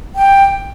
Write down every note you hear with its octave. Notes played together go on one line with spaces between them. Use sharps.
G5